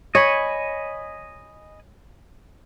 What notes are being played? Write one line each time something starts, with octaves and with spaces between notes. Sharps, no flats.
C#5 D#5 G#5 B5